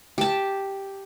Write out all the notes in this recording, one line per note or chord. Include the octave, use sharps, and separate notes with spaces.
G4 A5